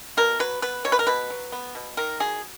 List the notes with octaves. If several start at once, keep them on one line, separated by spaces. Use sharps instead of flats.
B2 A#4
F#3 B4
B3 B4
B2 C#5
B4
A#4
B2 B4
F#3
B3
B2
D#3 A#4
F#3 G#4